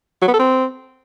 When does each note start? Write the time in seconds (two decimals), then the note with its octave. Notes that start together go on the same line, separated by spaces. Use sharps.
0.22 F#3
0.28 B3
0.34 A4
0.39 C4